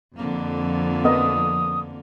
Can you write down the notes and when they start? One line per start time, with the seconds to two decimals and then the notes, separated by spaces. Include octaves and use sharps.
0.17 F2 D3 A#3
1.05 B3 A#4 D#5 D#6